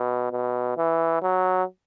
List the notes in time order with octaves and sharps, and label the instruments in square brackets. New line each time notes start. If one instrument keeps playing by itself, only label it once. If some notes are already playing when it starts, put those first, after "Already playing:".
Already playing: [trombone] B2
B2
E3
F#3